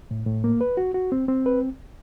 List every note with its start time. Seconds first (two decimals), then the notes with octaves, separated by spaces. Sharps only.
0.11 A2
0.26 A2
0.44 A#3
0.61 B4
0.77 F#4
0.94 F#4
1.12 C4
1.28 C4
1.46 B4